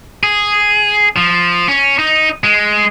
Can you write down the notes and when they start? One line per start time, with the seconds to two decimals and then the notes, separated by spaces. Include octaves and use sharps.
0.23 G#4
1.16 F3
1.68 C#4
1.99 D#4
2.44 G#3